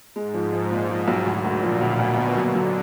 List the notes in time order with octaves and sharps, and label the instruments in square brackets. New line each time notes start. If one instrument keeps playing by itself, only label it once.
[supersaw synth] G#2 [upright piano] G#3
[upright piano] F3
F3
A#2
F3
B1
[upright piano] D2 [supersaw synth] A#2
[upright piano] D2
F3
[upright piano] D2 [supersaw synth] B2
[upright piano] D2
D2
[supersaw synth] D3 [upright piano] F#3
[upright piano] F#3